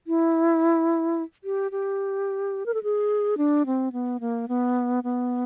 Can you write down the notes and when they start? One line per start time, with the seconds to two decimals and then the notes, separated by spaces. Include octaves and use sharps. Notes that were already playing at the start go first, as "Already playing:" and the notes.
0.07 E4
1.44 G4
1.72 G4
2.66 A#4
2.74 A4
2.83 G#4
3.38 D4
3.66 C4
3.92 B3
4.20 A#3
4.48 B3
5.04 B3